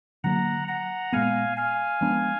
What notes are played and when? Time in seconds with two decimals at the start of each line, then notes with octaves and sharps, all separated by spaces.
0.24 D3 F#3 A#3 F#5 A#5
0.68 F#5 A#5
1.13 A#2 G#3 B3 F5 G#5
1.57 F5 G#5
2.01 F3 G#3 B3 D4